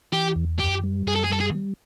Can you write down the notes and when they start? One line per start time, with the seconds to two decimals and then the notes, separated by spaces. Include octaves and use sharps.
0.12 E3 G4
0.36 E2
0.60 F#2 G4
0.84 G3
1.07 F#2 G#4
1.15 A4
1.24 G#4
1.30 G3 A4
1.40 G#4
1.55 G3